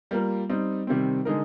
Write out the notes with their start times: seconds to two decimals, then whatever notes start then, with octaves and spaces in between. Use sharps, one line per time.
0.11 G3 A#3 F4 A#4
0.49 G3 C4 D#4
0.87 C3 D#3 G3 C4
1.25 D3 G#3 D#4 A#4